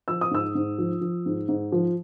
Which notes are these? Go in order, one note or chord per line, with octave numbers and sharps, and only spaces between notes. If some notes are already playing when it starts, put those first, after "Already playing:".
F3 E6
D#6
G#2 E6
G#2
F3
F3
G#2
G#2
F3